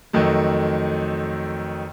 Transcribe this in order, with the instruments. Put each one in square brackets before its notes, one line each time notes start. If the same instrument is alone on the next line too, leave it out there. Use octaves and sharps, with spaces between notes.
[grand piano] F2 D#3 F#3 A3